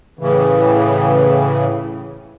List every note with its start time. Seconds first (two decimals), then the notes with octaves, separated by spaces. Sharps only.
0.19 A2 C#3 E3